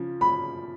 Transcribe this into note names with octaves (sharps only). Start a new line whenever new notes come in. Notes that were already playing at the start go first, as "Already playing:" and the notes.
Already playing: C#3 F3
B5